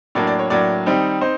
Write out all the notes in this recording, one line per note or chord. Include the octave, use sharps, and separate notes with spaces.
A2 F#3 A#3 D4 D5
D5
C#5
A2 F#3 A#3 D4 D5
D#3 G3 C4 D#4
C4 D#4 C5